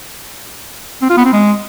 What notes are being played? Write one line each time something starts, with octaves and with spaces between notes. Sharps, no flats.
C4
F4
B3
C4
G#3